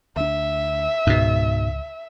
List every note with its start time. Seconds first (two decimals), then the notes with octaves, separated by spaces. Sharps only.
0.16 D2 A#3 D4 E5
1.07 C#2 G#2 B2